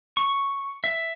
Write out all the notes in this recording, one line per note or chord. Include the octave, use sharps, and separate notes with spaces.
C#6
E5